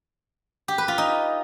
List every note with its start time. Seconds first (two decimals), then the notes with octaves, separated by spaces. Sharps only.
0.68 G4
0.78 B4
0.88 F4
0.98 D#4